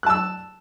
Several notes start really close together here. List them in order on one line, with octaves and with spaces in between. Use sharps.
F#6 A5 E6